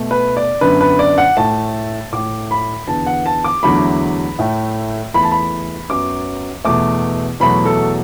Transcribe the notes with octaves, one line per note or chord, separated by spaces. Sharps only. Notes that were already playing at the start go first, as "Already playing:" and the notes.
Already playing: B2 A3
B4
D5
F#2 D3 B3 B4
B4
D5
F#5
A2 A3 A5
A2 A3 D6
B5
E2 D3 B3 A5
F#5
A5
D6
E2 D3 F#3 A3 B5
A2 A3
E2 E3 A3 B5
A5
B5
F#2 F#3 B3 D6
E2 B2 A3 D6
E2 B2 F#3 A3 B5
A4